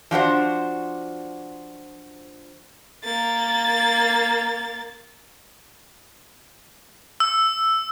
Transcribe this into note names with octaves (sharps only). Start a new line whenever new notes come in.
F3 D4 F#4 C5
A#3 A6
E6